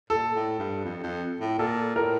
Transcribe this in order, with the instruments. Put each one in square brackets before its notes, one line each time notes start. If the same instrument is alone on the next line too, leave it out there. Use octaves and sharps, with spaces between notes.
[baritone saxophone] A#2 [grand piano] A4
[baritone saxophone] A2
G2
F2
F2
A2
[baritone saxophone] A#2 [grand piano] A4
[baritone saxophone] A2 [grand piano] A#4